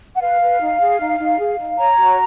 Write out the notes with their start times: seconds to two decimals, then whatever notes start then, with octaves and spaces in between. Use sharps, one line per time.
0.17 F#5
0.21 B4 F5
0.41 B4
0.61 D#4
0.80 G#4
1.00 D#4
1.19 D#4
1.39 G#4
1.58 D#4
1.78 C#5 A#5
1.97 F#4